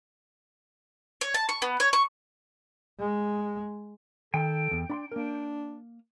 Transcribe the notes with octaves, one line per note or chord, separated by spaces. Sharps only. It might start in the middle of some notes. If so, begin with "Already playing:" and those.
C#5
A5
C#6
B3
C#5
C#6
G#3
D#3 A4 G5
E2
D4 B5 C6
A#3 D4 A#4